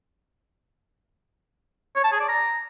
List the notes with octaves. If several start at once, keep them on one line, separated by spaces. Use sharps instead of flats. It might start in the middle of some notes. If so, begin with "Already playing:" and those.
C#5
A5
G#4
D5
A#5